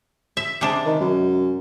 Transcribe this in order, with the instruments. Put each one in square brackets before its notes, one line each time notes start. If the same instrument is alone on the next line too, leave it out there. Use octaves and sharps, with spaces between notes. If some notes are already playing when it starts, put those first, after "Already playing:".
[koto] E5
C3 G#3 D4
[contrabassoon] D#3
F#2